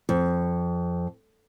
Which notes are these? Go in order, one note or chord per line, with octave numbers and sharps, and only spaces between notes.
F2